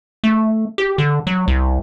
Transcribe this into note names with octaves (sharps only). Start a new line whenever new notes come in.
A3
G4
D3
F#3
C2